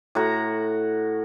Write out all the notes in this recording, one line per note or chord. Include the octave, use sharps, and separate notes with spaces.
A2 F#4 A#5